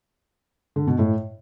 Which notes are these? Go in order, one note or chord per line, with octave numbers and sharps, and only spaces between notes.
D3
B2
A2